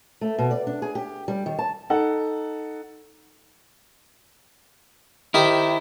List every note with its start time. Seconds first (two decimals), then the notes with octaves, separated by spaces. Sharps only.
0.21 A3
0.39 B2
0.51 D5
0.67 D4
0.82 G#4
0.95 G4
1.28 G3
1.46 D#3
1.59 A5
1.90 D#4 A4 F#5
5.34 D#3 E4 G4 C5